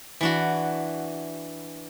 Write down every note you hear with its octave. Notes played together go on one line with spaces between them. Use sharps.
E3 D4 F#4